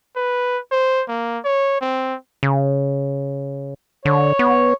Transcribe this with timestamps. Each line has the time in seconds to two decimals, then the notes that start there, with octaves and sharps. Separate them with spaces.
0.16 B4
0.72 C5
1.08 A#3
1.45 C#5
1.81 C4
2.43 C#3
4.05 D3 C#5
4.39 B3